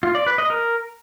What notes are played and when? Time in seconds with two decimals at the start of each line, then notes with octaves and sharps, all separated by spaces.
0.03 F4
0.15 D5
0.27 B4
0.38 D#5
0.50 A#4